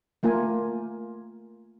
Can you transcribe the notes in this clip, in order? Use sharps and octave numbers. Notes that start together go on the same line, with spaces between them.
A3 A#3 F4 A#4 G#5